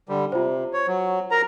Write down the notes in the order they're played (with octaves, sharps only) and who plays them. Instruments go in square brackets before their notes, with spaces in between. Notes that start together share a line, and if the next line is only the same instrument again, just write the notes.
[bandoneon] D3 G3
[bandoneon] C3 [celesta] F4 C5
[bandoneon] C#5
F#3
A#4 A#5